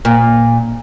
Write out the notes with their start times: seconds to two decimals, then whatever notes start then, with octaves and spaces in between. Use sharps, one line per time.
0.05 A#2